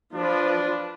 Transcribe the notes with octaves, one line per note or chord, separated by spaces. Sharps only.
F3 D4 F4 B4